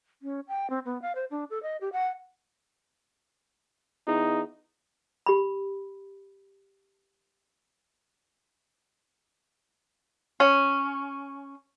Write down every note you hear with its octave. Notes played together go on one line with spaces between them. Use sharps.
C#4
G5
C4
B3
F5
C5
D4
A4
D#5
G4
F#5
E2 D#4
G4 B5
C#4